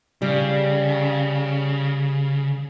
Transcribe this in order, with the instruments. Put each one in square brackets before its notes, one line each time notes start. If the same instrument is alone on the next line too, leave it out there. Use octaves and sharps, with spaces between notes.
[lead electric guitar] C#3 [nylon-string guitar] G3